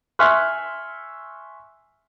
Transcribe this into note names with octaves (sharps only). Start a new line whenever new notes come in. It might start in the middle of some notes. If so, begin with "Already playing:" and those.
E5 G#5 C6 C#6 F6 F#6